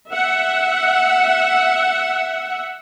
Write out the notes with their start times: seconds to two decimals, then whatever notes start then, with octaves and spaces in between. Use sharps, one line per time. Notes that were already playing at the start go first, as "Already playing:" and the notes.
0.10 E5 F#5